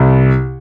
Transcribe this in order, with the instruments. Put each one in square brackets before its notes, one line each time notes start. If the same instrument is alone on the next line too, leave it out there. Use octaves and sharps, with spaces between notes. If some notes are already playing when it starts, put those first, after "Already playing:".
Already playing: [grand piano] C2